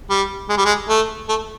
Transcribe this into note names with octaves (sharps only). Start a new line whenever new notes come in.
G3
G#3
G3
G#3
A3
A3